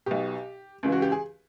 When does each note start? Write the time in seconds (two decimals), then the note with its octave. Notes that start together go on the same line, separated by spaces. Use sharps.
0.06 B1 B2 G4
0.83 C#2 C#3 E3
0.92 F#4
1.02 G4
1.12 G#4